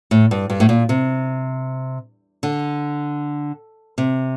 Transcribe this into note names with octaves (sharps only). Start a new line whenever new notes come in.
A2
G2
G2
A2
A#2
C3
D3
C3